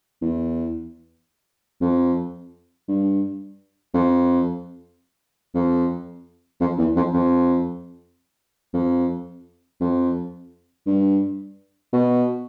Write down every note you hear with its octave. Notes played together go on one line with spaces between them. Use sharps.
E2
F2
G2
F2
F2
F2
E2
F2
F2
F2
F2
G2
B2